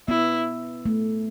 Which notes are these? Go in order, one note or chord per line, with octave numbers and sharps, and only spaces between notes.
B3 E4
A3